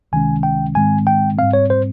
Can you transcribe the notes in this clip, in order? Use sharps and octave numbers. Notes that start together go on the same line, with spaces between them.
C#2 C3 D#3 G#3 C#4 G#5
G5
G#2 D#3 G#3 C4 G#5
G5
G#2 G3 C4 F5
C#5
C5